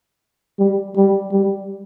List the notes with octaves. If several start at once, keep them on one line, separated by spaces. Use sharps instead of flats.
G3
G3
G3